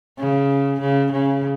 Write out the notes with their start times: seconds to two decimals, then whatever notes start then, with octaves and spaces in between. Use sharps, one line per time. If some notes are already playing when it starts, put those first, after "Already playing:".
0.18 C#3
0.81 C#3
1.12 C#3